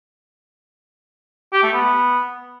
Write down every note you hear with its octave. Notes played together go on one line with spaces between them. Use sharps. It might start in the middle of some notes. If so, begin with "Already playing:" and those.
G4
A3
B3